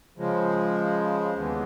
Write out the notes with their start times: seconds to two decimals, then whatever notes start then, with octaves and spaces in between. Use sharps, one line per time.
0.17 C#3 F3 G#3
1.35 D#2 C#3 E3 G#3 B3